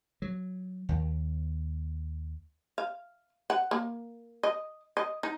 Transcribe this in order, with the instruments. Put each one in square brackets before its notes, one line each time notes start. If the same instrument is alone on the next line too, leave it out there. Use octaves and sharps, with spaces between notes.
[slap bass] F#3
D#2
[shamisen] F5
F#5
A#3
D#5
D#5
D#4